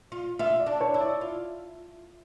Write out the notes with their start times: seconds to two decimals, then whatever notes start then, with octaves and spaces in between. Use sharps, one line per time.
0.12 F4
0.39 F4 E5
0.60 D5
0.67 D4
0.81 C#5
0.94 E4
1.01 D5
1.21 F4